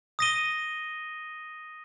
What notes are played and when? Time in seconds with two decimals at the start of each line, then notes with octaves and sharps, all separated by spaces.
0.19 D#6 A#6 D#7 G7